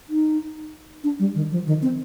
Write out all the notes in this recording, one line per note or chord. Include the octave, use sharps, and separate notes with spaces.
D#4
D4
G3
D#3
F3
D#3
C4